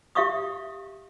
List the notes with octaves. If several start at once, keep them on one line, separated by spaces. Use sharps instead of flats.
G4 E5 F5 C#6 D#6